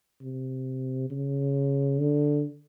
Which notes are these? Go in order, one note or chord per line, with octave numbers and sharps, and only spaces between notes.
C3
C#3
D3